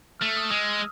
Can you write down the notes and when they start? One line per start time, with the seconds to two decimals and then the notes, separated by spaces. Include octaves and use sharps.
0.20 A3 F6
0.28 E6
0.37 D#6
0.51 G#3